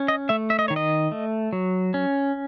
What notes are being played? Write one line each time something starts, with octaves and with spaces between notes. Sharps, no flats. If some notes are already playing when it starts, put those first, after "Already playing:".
Already playing: C#4
D#5
A3 E5
E5
D#5
D#3 C#5
D#5
A3
F#3
C#4